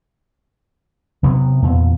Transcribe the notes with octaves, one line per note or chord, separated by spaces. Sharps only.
C3 F#3 B3
E2 A#2